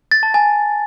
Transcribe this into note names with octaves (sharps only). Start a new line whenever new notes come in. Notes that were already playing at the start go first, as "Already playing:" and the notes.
A6
A5
G#5